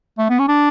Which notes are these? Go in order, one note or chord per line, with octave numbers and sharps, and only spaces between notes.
A3
B3
C#4
D4